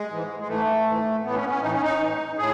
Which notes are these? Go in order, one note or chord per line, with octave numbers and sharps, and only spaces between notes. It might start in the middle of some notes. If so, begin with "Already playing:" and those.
Already playing: G#3
G#2 E3
G#3
G#2 E3 A3
G#2 E3
A2 E3 B3
C#4
B3
C#4
A2 E3 D#4
C#4
D#4
A2 E3
A2 G#4